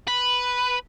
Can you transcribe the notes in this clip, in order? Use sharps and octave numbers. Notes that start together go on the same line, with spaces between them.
B4